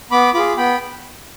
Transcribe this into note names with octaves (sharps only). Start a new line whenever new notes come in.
B3 B5 D6
F4 G#4 B5 D6
B3 G5 B5